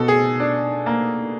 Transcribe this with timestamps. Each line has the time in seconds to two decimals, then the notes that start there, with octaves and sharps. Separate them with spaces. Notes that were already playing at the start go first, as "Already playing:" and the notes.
Already playing: B2 A4
0.08 G#4
0.40 D4
0.86 A#3